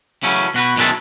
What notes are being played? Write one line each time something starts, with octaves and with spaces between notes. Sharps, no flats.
C#3 E3 F#3 A3 C#4
B2 F#4 B4
F#2 B2 D#3 G#3 E5 A5